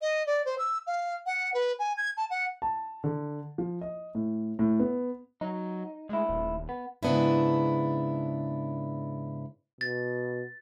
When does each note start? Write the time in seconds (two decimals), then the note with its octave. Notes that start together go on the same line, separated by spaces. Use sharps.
0.01 D#5
0.26 D5
0.45 C5
0.58 E6
0.87 F5
1.26 F#5
1.54 B4
1.79 G#5
1.97 G#6
2.17 A5
2.30 F#5
2.62 A5
3.04 D3
3.58 F3
3.81 D#5
4.15 A2
4.59 A2
4.80 B3
5.41 F#3 D#4
6.09 D2 G#3 E4
6.29 D#1
6.69 B3
7.03 G#2 C#3 B3 D4 E4
9.81 B2 A6